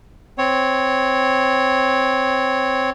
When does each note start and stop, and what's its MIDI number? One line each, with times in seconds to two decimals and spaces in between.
0.38 2.90 60
0.38 2.90 73